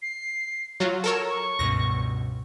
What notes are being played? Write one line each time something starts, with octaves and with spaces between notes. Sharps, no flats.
C7
F#3 F4 F#4
A4 A#4 C#5 E7
C#6
C#2 G2 B2 A#6